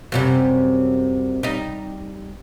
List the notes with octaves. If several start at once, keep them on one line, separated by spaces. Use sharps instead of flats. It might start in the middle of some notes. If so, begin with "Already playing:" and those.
F#2 C3 G3
G3 D#4